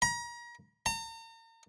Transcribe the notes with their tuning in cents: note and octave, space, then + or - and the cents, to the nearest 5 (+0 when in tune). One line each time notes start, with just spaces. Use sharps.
A#5 +35
A#5 -40